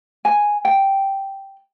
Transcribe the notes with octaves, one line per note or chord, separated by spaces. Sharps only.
G#5
G5